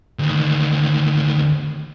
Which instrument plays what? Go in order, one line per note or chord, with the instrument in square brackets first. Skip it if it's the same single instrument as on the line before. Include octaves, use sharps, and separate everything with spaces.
[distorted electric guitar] D2 D#3